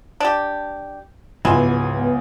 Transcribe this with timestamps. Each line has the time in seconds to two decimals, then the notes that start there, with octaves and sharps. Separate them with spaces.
0.20 D4 G4
1.45 C#2 G#2 E3 F#3 B3 G#5 C6